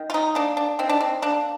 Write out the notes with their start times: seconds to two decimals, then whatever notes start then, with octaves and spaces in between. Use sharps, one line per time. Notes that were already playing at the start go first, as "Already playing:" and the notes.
Already playing: D#3
0.10 F4
0.14 D#4
0.35 A#3 D4
0.57 D4
0.79 D#3 C4
0.89 D4
1.01 C4
1.22 A#3 D4